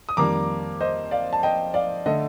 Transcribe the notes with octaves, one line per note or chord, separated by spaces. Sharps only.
D#6
F2 D#3 G3 A#3 A#5 D6
C5 D#5
D5 F5
A5
D#5 G5
D5 F5
D3 A3 D#5